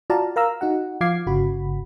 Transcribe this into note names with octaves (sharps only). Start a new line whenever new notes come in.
F4 F#4 D5 F5 A5 A#5
A#4 F5 A#5 E6
D#4 F#4 F#5
F3 F4 F5 D6 G#6 C7
G1 C#3 F#4 B5